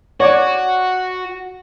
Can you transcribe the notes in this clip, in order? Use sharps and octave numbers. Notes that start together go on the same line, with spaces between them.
F#4 C#5 D5 D6